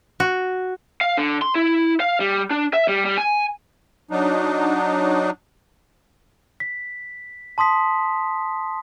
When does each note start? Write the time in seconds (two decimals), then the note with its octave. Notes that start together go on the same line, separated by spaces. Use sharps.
0.20 F#4
1.01 F5
1.18 D3
1.42 C6
1.55 E4
2.00 F5
2.20 G3
2.51 D4
2.73 E5
2.88 G3
3.05 G3
3.18 G#5
4.11 F#3 D4 D#4
6.60 B6
7.58 A5 C6 D#6 B6